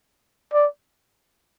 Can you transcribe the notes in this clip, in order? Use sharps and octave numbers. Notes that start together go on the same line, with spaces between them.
D5